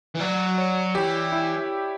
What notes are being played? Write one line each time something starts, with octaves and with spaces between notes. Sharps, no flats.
E3
F#3 D5
C#5
E3 G4
E4